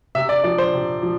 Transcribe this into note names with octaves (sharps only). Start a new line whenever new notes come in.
C3 E5
D5
F3 D5
C5
C3
F3